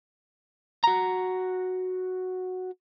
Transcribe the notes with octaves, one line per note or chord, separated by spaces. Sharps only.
F#4 A#5